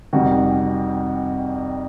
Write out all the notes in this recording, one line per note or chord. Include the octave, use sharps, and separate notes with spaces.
F2 C3 D#3 G3 F#4